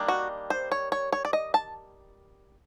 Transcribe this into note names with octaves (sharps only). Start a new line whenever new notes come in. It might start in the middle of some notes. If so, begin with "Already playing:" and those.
Already playing: D#3 G3 A#3 D4
F#4
C5
C#5
C#5
C#5
D5
D#5
A5